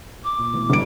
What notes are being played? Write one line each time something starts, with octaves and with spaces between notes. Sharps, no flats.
D6
A#2
B2 E3 A3
G1 C#3 F#3 G3 D7